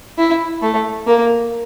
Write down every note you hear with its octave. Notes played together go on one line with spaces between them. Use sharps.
E4
A3
A#3